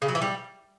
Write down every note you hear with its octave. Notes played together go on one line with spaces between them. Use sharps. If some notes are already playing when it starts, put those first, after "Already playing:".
C#3
F#3
E3
G3